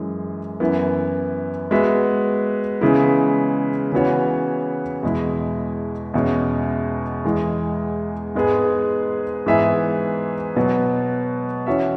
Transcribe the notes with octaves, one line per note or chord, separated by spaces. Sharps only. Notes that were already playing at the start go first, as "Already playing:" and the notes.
Already playing: F#2 E3 G#3
F#2 E3 B3 E4
G#3 B3 F#4 E5
C#3 E3 G#3 B3 E4
C#3 E3 B3 F#4 C#5
E2 B2 G#3 E4
E2 B2 G#3 C#4
E2 E3 G#3
G#2 G#3 B3 G#4
G#2 E3 B3 G#4 E5
B2 F#3 B3 F#4
E3 C#4 F#4 C#5 E5